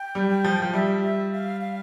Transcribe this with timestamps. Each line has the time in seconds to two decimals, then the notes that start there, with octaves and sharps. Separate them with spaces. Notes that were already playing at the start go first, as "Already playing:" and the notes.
Already playing: G5
0.15 G3
0.30 G5
0.44 F3
0.62 F3
0.73 G3 E5
1.03 E5
1.32 F5
1.61 F5